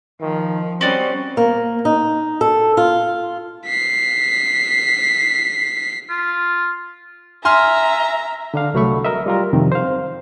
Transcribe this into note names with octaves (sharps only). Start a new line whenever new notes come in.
D#3 F3
G3 C4 C#4 F#4 D5 D#5
A#3
D#4
A4
F4
B6 C7
F4
E5 G#5 A#5 C6 F6
D3 D4 F5
C2 F#3 A3 B5 C#6
A#4 D#5 E5
G3 F4 A#4
F2 C3 D#3
C5 F5